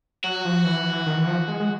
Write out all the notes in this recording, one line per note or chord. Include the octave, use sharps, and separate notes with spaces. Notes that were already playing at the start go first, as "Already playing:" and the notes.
F#3 F#4
F3
E3
D#3
E3
F3
G#3
G#3